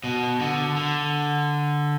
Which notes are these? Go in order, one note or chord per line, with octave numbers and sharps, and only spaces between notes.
B2
D3
D3